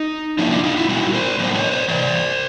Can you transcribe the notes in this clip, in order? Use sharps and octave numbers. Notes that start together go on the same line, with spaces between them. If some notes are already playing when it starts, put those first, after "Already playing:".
Already playing: D#4
F3 A#3 C#4 D4 E4
D4 E4
D#4 F4
E4 F#4
B2 G3 B3 E4 F#4
A#4 C5
A2 F#3 B3 D4 A#4 C5
B4 C#5
C5 D5
C3 E3 C5 D5